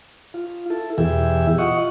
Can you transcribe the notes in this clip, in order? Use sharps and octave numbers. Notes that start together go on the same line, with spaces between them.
F4
E4 A4
E2 B2 E3 G4 G#4 E5
F4 D#5 F#5 C#6